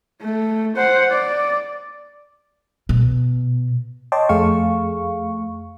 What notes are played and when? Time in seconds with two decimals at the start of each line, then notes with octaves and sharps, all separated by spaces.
0.22 A3
0.76 C5 F#5
1.11 D5
2.89 B2
4.12 C#5 D#5 G5 A5 C6 D6
4.29 F2 A3 G#4 F5 C#6